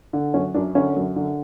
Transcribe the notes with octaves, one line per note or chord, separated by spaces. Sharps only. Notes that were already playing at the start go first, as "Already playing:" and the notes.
D3
F#2 C#4
F#2 D4
D3 C#4
F#2
D3